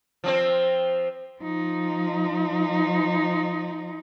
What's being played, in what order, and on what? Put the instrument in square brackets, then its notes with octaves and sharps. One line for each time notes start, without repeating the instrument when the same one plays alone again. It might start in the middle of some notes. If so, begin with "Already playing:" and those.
[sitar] F3 C4 C5
[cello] F3 D#4